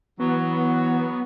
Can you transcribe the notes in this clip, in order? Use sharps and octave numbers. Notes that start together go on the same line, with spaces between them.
E3 F#3 B3